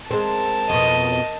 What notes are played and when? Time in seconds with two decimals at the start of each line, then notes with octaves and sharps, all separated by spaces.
0.11 G#3 C4 A#4 A5
0.70 F2 B2 D#5